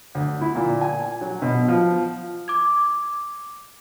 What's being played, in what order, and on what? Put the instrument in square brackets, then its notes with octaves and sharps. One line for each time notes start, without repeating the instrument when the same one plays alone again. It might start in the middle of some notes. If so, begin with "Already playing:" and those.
[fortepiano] D2
E4
A#2
G#5
F#3
B2
F3
[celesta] D6 G#6